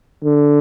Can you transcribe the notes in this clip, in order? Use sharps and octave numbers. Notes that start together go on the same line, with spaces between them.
D3